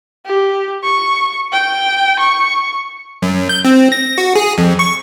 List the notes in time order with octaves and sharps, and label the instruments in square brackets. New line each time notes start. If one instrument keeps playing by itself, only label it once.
[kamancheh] G4
C#6
G5
C#6
[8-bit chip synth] F#2
G6
C4
A#6
F#4
G#4
F2
C#6